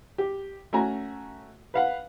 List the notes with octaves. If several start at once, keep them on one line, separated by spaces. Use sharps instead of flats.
G4
A3 C#4 F#4 G#5 A#5
B4 F5 F#5